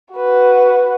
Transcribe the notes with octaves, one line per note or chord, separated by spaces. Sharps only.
F#4 B4